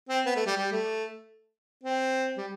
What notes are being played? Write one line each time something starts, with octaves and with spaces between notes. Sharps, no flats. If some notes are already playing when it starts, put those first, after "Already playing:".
C4
B3
A3
G3
G3
A3
C4
G3